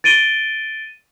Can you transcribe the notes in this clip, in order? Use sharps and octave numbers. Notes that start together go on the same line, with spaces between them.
A6 D7 D#7 G7